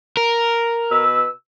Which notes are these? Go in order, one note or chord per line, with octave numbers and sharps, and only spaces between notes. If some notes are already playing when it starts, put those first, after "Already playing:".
A#4
B2 B4 E6